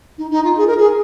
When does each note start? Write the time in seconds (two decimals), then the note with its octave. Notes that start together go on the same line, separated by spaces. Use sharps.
0.18 D#4
0.31 D#4
0.44 F4
0.57 G#4
0.67 A#4
0.77 G#4